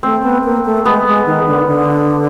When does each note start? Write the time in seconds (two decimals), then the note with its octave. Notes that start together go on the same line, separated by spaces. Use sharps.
0.03 A3 C4
0.23 B3
0.44 A#3
0.65 A3
0.85 G#3 B3
1.06 G#3
1.26 D#3
1.47 D3
1.68 D3